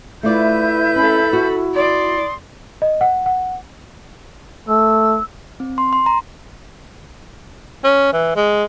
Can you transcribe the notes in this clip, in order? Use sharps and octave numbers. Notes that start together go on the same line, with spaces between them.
A3 E4 F4 B4 D5 E5 G6
C#4 A4 B5
F#4
D5 C6 D#6
D#5
F#5
F#5
A3 E6
C4
C6
C6
A#5
C#4
E3
G#3